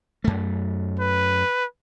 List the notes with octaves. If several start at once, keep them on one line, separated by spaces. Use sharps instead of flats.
F#2 A3
B4